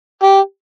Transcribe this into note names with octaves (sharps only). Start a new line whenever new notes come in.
G4